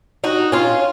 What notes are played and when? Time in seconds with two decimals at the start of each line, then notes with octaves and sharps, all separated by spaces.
0.24 D#4 F#4
0.52 C#4 F4